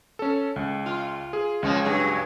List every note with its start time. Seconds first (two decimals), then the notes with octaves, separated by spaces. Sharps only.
0.19 C#4 A4
0.56 C#2
0.86 F4
1.33 G#4
1.63 C#2 C#3 F3 G#3
1.85 G2 F#3 G#4